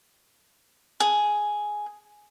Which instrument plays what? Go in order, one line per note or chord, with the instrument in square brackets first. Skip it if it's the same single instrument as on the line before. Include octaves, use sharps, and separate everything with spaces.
[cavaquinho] G#4